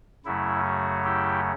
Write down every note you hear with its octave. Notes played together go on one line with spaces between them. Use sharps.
F#2 C#3 F#3 A3 E4
F#4
E4 G4